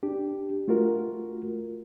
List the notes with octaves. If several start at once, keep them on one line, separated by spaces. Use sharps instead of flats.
D4 G4
A3 F4 F#4 A#4